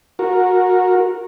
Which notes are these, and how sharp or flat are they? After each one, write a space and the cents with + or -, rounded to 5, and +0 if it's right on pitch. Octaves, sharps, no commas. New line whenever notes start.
F#4 -20 A#4 +0